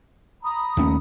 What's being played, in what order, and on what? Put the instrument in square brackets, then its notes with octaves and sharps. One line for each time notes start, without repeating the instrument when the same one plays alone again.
[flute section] A#5 B5 D#6
[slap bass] D#2 A3 C#4